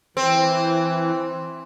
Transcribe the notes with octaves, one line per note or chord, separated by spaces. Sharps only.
E3 C4